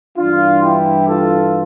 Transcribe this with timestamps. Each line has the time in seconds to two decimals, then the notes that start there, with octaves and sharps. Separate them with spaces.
0.17 G2 E3 D4 F4
0.63 E4 G4
1.08 F4 A4